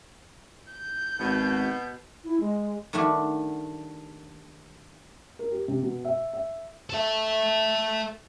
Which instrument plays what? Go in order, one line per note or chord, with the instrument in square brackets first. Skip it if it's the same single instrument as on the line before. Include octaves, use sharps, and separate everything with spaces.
[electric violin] G6
[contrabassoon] G#1 [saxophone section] B2
[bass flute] E4
G#3
[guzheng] D#3 G3 A3 D4 F#4
[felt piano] A#4
G4
C3
B2
E5
E5
[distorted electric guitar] A4 E5